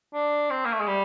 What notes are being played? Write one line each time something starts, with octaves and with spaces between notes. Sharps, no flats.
D4
C4
A#3
A3
G#3
G3